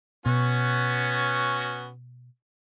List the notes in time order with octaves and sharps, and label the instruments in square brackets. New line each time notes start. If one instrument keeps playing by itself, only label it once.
[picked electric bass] B2 [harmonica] B3 C#4 F#4